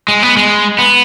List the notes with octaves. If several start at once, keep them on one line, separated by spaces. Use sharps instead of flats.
G#3
B3
G#3
B3